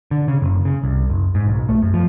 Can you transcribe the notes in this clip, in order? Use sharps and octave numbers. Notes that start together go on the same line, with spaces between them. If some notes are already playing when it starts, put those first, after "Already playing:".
D3
C#3
F#1
C#3
C2
F#1
G#2
B1
A3
F#2
F3